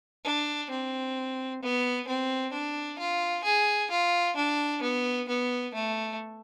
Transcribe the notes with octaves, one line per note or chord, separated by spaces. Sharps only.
D4
C4
B3
C4
D4
F4
G#4
F4
D4
B3
B3
A3